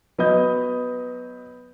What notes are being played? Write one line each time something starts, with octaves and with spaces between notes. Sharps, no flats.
F#3 B3 B4 D#5 D#6 G6